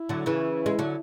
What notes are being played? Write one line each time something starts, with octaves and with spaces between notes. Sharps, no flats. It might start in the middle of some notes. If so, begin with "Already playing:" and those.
Already playing: E4
D3 F#3
C#3 E3
G#3
D3 F#3